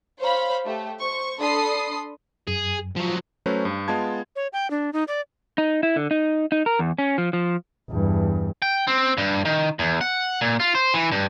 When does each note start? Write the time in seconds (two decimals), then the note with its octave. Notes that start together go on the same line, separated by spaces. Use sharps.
0.20 C5 C#5 F5 B5
0.65 A3 G4
1.00 C5 C#6
1.40 D4 A4 B5 C6 D#6 C7
2.47 F#2 G#4
2.96 F3 F#3 F4
3.46 F#3 A3 C#4 B4 C5
3.65 G2
3.88 G#3 B3 F4 A5 G#6
4.36 C#5
4.53 G5
4.71 D4
4.93 D#4
5.08 D5
5.58 D#4
5.83 E4
5.96 D3
6.11 D#4
6.52 D#4
6.66 A#4
6.79 E2
6.99 C#4
7.18 F3
7.33 F3
7.90 E2 G2
8.62 G5
8.87 C4
9.18 G2
9.45 D#3
9.79 E2
10.01 F#5
10.41 A#2
10.60 F4
10.75 C5
10.94 E3
11.12 G2